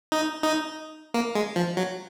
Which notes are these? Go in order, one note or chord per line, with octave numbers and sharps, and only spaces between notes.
D#4
D#4
A#3
G#3
F3
F#3